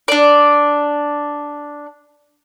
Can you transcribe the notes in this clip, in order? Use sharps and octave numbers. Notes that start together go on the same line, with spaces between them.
D4 D5